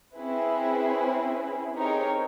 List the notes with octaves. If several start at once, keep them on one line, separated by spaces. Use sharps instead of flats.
C4 C#4 E4 G#4 B4
C4 D#4 G4 G#4 A#4 C#5